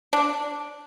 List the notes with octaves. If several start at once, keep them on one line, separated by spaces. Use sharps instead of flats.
D4